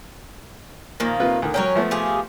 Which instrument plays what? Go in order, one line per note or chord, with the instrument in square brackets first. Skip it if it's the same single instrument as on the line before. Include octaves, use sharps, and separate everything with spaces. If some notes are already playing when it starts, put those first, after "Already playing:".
[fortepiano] A#2 [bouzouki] D#3 F3 A#3
[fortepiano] C3 F4 B4
D2 D#3
[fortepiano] F#3 G5 [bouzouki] C#4 A#4 C#5
[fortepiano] F3 A3 B3
[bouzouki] F4 G4 G#4